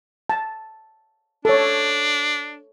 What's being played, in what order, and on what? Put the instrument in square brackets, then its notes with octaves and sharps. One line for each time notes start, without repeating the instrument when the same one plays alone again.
[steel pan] A5
[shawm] D4 [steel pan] A4 C#5